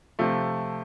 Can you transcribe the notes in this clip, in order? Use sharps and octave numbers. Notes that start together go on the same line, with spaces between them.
C3 F3 A3